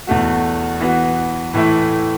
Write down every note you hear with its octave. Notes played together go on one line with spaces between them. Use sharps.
E2 B2 A3 F#4
E3 B3 F#4
A2 E3 A3 E4